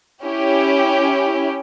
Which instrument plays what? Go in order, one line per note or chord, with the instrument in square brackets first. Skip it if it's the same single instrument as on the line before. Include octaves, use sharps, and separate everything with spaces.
[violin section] C#4 E4 G4